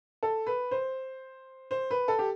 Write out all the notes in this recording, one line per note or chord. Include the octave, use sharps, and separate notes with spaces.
A4
B4
C5
C5
B4
A4
G4